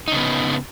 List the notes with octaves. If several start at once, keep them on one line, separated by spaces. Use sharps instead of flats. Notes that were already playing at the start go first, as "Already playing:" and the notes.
C#3 B3 D#4